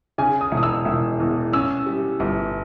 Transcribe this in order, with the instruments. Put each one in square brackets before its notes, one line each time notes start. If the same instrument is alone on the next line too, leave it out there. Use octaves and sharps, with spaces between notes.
[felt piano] C#3 [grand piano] G#5
[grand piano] D#6
[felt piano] E1
[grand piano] D#6
E6
[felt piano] E1
E2
[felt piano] C#4 [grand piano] E6
[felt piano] G3
G1